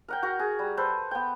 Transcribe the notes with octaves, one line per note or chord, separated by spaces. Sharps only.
A#4 F#5 G5
F#4 A#4
G#4
G3
A4 B4 C5
B3 G5